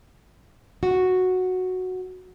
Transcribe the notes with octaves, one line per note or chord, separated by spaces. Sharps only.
F#4